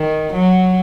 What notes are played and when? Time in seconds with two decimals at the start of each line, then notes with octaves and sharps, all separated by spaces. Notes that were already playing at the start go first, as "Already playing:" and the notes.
Already playing: D#3
0.33 F#3